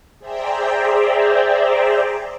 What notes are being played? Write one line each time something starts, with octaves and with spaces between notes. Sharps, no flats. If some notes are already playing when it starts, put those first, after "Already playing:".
G#4 C5 D5 E5 G5 A#5